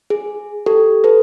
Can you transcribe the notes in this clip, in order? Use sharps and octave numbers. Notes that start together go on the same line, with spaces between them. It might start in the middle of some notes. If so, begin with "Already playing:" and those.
G#4
G4 A4
A4 B4